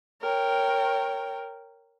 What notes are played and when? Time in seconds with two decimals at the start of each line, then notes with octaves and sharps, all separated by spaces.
0.22 A#4 C#5 G5